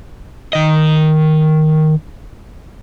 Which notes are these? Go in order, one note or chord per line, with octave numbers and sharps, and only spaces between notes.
D#3 D#5